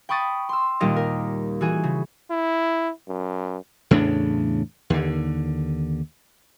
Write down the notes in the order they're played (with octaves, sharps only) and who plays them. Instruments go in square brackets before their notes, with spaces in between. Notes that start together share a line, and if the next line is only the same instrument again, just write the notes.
[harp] G5 B5 C#6 D#6 A6
C6 E6
D#2 A#2 G3 A#3 G4 D#5
A#4
E3 F#4 G#4 G#5
C#3
[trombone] E4
F#2
[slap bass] E2 A2 C#3 D4
D#2 D3